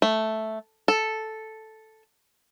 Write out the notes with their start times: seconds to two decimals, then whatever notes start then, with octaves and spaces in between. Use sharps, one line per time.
0.02 A3
0.88 A4